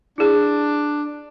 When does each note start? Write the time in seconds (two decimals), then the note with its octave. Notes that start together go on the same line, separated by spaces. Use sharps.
0.18 D4 E4 G#4